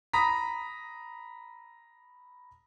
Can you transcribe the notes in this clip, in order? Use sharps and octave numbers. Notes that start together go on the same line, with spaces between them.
A#5 B5 D#6 A#6 B6